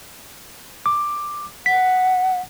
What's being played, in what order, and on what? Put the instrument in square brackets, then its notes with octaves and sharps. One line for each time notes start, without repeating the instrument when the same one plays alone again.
[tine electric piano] D6
[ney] F#5 [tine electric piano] B6